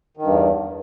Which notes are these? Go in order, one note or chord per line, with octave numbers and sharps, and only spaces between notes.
E2 G2 D#3